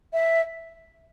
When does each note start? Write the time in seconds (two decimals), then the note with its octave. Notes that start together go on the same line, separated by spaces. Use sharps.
0.13 E5